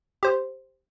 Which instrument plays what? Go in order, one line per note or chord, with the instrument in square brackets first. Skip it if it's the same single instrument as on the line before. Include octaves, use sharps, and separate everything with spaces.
[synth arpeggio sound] G4 C5